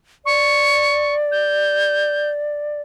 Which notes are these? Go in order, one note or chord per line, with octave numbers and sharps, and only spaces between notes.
D5 C#6
G6